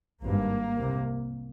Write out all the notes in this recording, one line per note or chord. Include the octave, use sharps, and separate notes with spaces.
G#1 G2 A#3
C2 C3